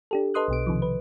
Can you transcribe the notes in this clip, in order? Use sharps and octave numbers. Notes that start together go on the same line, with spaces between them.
D4 G4 A4
A4 B4 D#5 C6 D#6 F#6
B1 B2 D7
C3 D#3 F3
B4